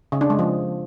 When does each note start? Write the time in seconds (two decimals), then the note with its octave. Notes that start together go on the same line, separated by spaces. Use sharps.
0.12 C#3
0.21 D4
0.30 G#3
0.39 F3